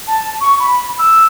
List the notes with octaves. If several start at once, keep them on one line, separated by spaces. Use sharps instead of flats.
A5
C#6
B5
E6